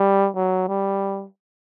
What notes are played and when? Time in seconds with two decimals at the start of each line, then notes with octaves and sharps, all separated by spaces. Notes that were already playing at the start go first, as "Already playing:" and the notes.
Already playing: G3
0.36 F#3
0.68 G3